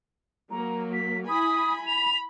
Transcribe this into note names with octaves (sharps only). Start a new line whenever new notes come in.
F#3 A#3 A#5
B6
E4 G#5 B5 D#6
B5 F7